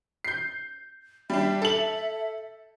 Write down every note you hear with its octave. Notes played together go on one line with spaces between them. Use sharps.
G6 C7
G3 D4 E5
A4 F#7